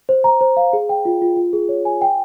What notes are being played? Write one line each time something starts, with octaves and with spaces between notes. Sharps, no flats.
C5
A#5
C5
F5
G#4
G5
F4
F4
F4
G#4
C#5
G#5
G5